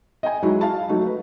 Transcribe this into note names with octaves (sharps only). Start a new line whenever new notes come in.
D#5 G5 G#5
F#3 G#3 D#4 E4 F#4
F5 A5
F#3 A3 D#4 F#4
B4